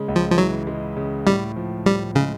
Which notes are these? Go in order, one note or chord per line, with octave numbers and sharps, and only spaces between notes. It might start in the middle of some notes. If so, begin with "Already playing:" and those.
Already playing: C#3 G#3
C#2
F3
F3
E3 F#3
G#3
C#3
A2 G3
F3
A2 G3
C#3 G#3